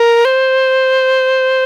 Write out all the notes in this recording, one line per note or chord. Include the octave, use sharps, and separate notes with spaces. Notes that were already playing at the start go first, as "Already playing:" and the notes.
Already playing: A#4
C5